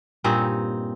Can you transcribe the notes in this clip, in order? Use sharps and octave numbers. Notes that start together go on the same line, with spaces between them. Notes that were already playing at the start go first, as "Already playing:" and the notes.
G2 A#2 C4 D#4